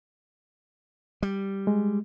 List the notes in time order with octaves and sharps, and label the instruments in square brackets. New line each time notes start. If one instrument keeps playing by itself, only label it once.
[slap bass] G3
[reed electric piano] G#3